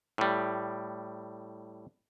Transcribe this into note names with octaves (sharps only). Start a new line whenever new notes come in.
A2 G3